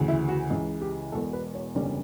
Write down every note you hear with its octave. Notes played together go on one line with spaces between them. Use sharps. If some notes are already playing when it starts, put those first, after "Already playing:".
Already playing: D2 C#3 E3
E4
F#4
C#2 C#3 E3
G4
E1 E2 B2 A4
B4
C#5
F#1 E2 D3 G3 C#4 D5